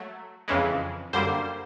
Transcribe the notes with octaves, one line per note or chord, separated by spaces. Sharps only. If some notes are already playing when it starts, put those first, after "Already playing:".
Already playing: F#3 A3
F2 C#3 E3 G#3
F#2 D3 G3 A#3 C5